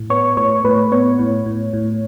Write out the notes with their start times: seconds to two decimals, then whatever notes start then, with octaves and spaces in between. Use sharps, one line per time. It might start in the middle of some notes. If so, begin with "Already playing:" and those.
Already playing: A2
0.10 B3 C#5
0.37 A2 C#5
0.64 A2 B4
0.92 B3 C#5
1.19 A2
1.46 A2
1.73 A2